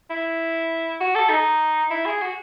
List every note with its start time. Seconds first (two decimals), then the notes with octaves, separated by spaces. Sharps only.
0.10 E4
1.01 F#4
1.15 A4
1.30 D#4
1.91 E4
2.06 G#4
2.22 F#4